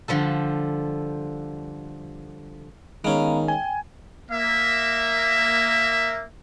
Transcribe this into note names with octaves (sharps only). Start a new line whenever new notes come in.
D3 F3 G3 A4
D#3 G#3 B3 C#4 F5 A#5
G5 G#5
A#3 E5